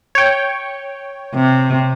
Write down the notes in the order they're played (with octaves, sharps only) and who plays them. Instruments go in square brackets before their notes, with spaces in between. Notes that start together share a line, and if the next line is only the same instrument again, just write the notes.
[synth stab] C#5 G5
[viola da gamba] C3